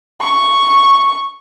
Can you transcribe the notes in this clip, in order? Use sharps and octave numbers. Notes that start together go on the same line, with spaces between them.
C#6